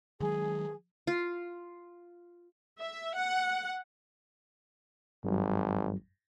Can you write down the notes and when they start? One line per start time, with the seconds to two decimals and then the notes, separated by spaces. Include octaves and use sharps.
0.21 D#3 F#3 G#3 G#4
1.07 F4
2.78 E5
3.14 F#5
5.24 G#1 G2 F#3 G3